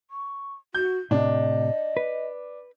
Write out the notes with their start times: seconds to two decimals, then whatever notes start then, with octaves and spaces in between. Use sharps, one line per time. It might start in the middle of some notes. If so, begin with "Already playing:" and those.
0.11 C#6
0.74 F#4 G6
1.11 A2 C3 D4 D#5
1.97 B4